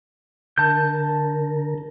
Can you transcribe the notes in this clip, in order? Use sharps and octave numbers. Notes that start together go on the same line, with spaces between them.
D3 A#4 A5 G6